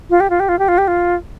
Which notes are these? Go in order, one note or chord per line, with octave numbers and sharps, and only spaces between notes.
F4
G4
F4
G4
F4
G4
F4
G4
F4